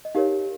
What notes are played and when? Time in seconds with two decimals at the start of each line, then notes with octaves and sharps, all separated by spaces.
0.05 D#5
0.15 D#4 G4 A#4 C#5 F5